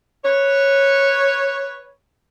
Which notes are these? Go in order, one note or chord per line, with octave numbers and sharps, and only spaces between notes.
B4 C#5